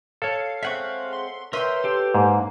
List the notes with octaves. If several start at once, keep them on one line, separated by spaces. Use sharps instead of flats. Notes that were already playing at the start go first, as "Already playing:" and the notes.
A4 C#5 F5
G#3 C4 E5 F#5 C#6
C6
A#4 B4 C#5 E5 G5 C6
G4 A4
G#2 A#3